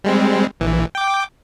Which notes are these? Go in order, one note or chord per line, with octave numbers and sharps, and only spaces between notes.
G3 G#3 C4
A#1 E3
G5 D6